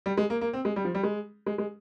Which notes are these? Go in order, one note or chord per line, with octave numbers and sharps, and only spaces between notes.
G3
G#3
A#3
A#3
C4
G#3
G3
F3
G3
G#3
G#3
G#3